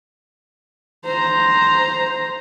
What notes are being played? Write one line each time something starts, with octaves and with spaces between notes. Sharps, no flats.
C5 A#5